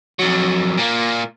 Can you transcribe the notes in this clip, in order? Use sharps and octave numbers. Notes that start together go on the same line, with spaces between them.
F2 F#3
A#2 A#3